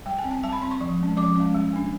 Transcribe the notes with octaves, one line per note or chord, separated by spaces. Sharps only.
G3 G5
G#5
C4
G#5
G3 A5
B5
C4 C6
C#6
F3
G#3 C#4
F3 D6
G#3 C#4
G3
A#3 D4